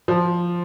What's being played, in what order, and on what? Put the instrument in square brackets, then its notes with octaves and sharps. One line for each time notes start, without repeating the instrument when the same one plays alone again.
[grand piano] F3